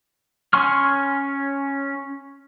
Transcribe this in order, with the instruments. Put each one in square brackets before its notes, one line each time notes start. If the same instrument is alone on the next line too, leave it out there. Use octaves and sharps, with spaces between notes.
[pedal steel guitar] C#4 G#5 C6 C#6 F6